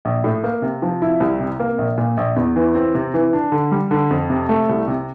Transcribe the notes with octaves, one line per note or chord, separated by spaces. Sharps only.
A#1
A2
A#3
C3
F3
E4
C2
C3
A#3
A#1
A#2
A#1
E2
E3
C4
C3
E3
D4
D3
G3
D3
F2
C3
A3
C2
C3